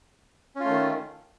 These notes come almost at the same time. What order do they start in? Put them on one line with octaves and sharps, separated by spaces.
C#4 F4 A3 D#3